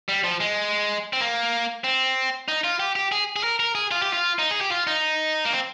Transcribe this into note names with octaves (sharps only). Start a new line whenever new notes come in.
G3
F3
G#3
C4
A#3
C4
D#4
F4
G4
G4
G#4
G#4
A#4
A#4
G#4
F4
G4
F4
D#4
G#4
G4
F4
D#4
A#3
C4